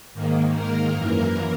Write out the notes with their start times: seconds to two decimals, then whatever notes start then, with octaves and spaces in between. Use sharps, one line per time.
0.14 G#2 D#3 A#3
0.55 A#3 A#4
0.95 F#2 E3 A#3